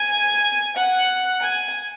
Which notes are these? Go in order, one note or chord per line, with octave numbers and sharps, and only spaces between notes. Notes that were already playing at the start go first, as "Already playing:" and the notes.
Already playing: G#5
F#5
G#5